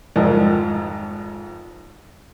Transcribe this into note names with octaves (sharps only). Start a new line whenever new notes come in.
G#1 F2 G#2 A#4 D5 D#5